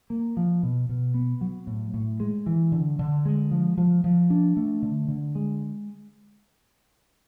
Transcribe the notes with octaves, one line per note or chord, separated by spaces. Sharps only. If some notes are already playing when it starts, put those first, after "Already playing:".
A#3
F3
B2
B2
B3
F#3
A2
A2
G#3
E3
D3
D3
G#3
F3
F3
F3
D4
A3
D3
D3
G#3